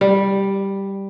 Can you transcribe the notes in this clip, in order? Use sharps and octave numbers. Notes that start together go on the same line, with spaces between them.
G3